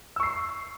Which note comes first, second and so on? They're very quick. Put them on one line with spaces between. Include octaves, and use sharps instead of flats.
E6 C#6 C7